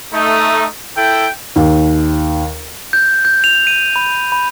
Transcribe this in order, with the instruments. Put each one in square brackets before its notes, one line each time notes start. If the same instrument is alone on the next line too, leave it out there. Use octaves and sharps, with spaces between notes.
[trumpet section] A3 D#4
E4 A4 G5
[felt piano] D#2
[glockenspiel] G6
G6
F7
D#7
B5
B5